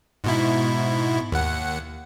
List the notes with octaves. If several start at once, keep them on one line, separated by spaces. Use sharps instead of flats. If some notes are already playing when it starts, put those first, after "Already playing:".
G#2 B2 E4
D#2 F#5